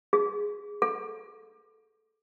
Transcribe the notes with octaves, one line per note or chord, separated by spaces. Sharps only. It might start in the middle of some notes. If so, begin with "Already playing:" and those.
G#4
A4